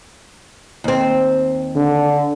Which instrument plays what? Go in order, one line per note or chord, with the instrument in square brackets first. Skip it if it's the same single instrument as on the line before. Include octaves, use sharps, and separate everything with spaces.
[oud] D#2 C4
[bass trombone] D3